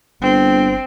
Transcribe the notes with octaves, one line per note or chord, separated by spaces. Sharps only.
G1 C4